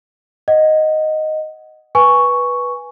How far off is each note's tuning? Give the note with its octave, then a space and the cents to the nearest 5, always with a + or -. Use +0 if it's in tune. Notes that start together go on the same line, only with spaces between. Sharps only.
D#5 +0 F#5 +0
B4 -10 G#5 +0 C#6 +0